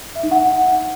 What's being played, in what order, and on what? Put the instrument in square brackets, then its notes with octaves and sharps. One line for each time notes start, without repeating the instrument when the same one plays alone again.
[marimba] E5
D#4
F#5